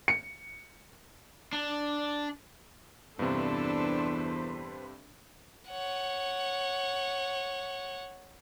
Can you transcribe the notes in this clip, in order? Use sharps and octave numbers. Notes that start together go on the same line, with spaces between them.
C#7
D4
E2 G2 C3 D4 A4 B4 C5
C#5 F#5